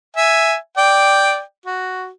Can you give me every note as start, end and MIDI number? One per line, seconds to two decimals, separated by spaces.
0.17 0.56 76
0.17 0.56 80
0.77 1.41 74
0.77 1.41 79
1.65 2.09 66